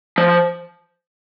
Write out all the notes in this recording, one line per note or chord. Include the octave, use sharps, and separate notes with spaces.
F3